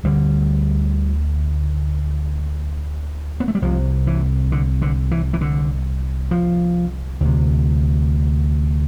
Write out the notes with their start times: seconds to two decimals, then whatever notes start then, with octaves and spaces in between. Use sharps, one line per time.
0.04 D2 D3 G3
3.40 B3
3.48 A3
3.55 G3
3.62 C2 C3 F3
4.07 E3
4.52 D3
4.82 D3
5.11 E3
5.33 E3
5.41 D3
6.31 F3
7.21 D2 C3